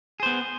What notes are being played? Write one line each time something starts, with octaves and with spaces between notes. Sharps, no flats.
B3 G#4 C5